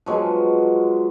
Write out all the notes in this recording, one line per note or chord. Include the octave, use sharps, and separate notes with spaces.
F3 F#3 G#3 B3